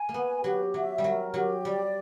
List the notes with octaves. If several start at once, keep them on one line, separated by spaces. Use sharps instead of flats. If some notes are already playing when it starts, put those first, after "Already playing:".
Already playing: G#5
A#3
B3 B4
F#3 G4
F#3 E5
G3
F#3 A#4
F#3 G4
G3 D5